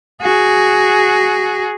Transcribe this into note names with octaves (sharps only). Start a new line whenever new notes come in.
F#4 G#4